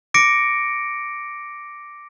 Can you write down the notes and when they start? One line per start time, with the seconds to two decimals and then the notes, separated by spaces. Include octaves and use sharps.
0.14 D6 A#6 C#7 D7